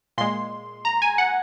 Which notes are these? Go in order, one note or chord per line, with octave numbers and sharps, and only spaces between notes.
A#2 G#3 C6
A#5
G#5
F#5